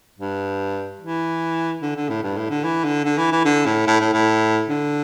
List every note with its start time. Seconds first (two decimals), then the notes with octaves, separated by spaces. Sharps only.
0.19 G2
1.00 E3
1.82 D3
1.96 D3
2.09 A2
2.23 G2
2.37 A2
2.50 D3
2.64 E3
2.84 D3
3.05 D3
3.18 E3
3.32 E3
3.45 D3
3.65 A2
3.87 A2
4.00 A2
4.13 A2
4.68 D3